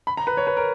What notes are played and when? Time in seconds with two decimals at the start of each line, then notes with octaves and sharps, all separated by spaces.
0.07 B5
0.17 A#5
0.27 B4
0.37 C#5
0.47 B4
0.57 A#4